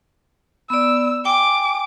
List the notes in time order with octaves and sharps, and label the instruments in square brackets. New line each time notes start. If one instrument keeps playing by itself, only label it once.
[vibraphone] B3 D5 [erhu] E6
[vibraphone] G5 G#5 [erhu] D6